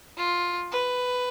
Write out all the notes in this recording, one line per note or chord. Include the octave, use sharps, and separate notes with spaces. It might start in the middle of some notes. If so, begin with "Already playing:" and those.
F4
B4